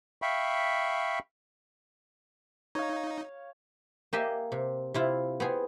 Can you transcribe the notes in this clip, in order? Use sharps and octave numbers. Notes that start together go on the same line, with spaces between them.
E5 F5 G5 B5 C#6
D#4 C#5 F5
A#3 G4 D#5 E5 G#5
C3
C3 E4 F4
B3 C4 G#4